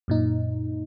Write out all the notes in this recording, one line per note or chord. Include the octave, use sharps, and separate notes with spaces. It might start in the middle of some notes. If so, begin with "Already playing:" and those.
F#2 A#2 D#4